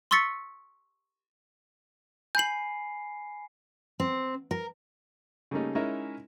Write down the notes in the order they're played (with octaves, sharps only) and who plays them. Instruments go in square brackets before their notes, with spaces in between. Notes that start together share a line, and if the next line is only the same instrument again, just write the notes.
[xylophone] C6 C#6 E6 A6 B6 C#7
[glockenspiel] G#5 B5 C7 [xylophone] G6 F#7
[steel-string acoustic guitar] C4
A#4
[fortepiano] C#3 G3 A3 A#3 C#4 D#4
G#3 C#4 D#4 E4 A#4 E5